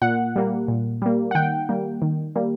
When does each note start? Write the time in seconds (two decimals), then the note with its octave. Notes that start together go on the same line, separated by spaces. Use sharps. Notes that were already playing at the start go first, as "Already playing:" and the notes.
0.01 A#2 F#5
0.36 G3 A#3
0.68 A#2
1.02 G3 A#3
1.31 F#5
1.35 D#3 G5
1.69 G3 A#3
2.02 D#3
2.36 G3 A#3